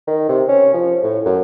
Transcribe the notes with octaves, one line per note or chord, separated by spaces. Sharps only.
D#3
C3
C#4
F3
A2
F#2